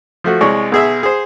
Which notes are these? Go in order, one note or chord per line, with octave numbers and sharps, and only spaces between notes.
F3 A3 F#4
C2 G#3 C#5
B1 G#4 E5
G#4 C5